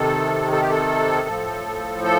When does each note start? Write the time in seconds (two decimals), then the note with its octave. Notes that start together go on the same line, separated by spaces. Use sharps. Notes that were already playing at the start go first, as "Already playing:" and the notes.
Already playing: C3 D#3 A4
0.52 A4
0.61 G4
0.70 A4
1.28 A2 F3
2.04 A4